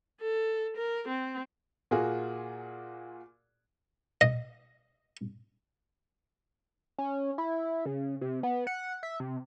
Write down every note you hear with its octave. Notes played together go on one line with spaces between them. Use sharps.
A4
A#4
C4
A#2 A#3 F4 F#4 G#4
D#5
C#4
E4
C#3
C3
B3
F#5
E5
C3